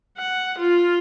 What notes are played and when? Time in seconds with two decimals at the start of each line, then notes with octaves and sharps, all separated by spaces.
0.18 F#5
0.58 F4